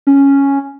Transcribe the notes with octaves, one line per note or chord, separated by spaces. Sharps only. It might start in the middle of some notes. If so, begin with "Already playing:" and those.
C#4